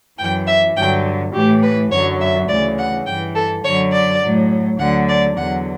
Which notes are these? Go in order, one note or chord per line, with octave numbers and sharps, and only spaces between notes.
F#2 E3 G5
E5
G2 D3 F#3 G5
A2 E3 G4
B4
F#2 D3 F#3 C#5
E5
D2 C#3 E3 D5
F#5
G2 E3 G5
A4
F#2 D3 F#3 C#5
D5
A2 F#3
D2 D3 F#3 F#5
D5
E2 D3 F#3 F#5